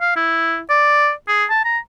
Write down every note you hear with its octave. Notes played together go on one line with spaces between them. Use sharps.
F5
E4
D5
G#4
A5
A#5